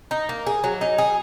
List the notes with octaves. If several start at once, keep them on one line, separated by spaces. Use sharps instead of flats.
D#4
A#3
G#4
F#3
D#4
G#4